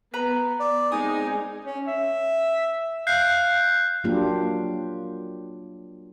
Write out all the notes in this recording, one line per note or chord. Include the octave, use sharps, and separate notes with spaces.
B3 B4 A#5 B5
D5
G#3 C4 D#4 G#5 D#6
C#4
E5
F5 F#6 G6 C7
F#3 A#3 D4 F4 G4